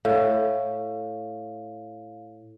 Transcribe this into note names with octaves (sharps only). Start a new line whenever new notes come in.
A2 F5